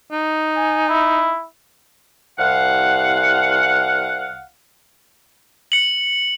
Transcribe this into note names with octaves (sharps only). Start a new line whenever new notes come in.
D#4
G#5
E4
C2 F5 F#5
C#7 F#7